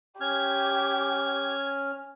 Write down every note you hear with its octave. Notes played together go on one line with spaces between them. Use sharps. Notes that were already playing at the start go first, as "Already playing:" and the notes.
C#4 G4 F6 G#6